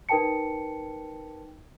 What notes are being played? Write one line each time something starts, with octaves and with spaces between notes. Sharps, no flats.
D#4 A#4 B4 G5 A5 C#7